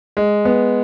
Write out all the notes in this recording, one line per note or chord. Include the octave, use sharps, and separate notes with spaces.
G#3
B3